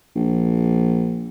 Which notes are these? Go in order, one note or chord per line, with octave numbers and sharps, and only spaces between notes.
A#1